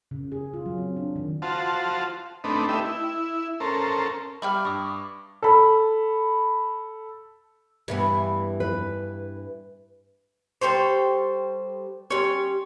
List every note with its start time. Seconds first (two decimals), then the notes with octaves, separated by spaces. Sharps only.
0.11 C#3
0.32 G#4
0.54 F4
0.66 F#3
0.78 C4
0.97 D4
1.16 D#3
1.42 F4 F#4 C5 A5
2.44 A3 C4 D4 D#4 B4
2.69 A3 D#4 G4 B4 E5
2.85 E4
3.60 C#4 A4 A#4 C5
4.42 G3 E5 F5 G5 B5 D6 F6
4.65 G2 C#6 D#6
5.42 A4 B5
7.88 G2 E3 B3
8.60 B4
10.61 G3 A4 C5 C#5 G5 C6
12.10 G3 C#4 C#5 C6